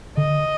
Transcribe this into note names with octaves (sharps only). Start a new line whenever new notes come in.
D3 D#5